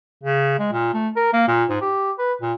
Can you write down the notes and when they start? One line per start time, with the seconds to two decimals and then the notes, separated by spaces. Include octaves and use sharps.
0.24 C#3
0.59 G#3
0.72 A#2
0.94 A3
1.16 A#4
1.33 A#3
1.48 A#2
1.70 G#2
1.81 G4
2.19 B4
2.42 A#2